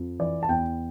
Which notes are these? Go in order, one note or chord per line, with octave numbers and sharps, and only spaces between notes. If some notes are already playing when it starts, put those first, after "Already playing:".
Already playing: F2
E3 D5
A5
E2 G5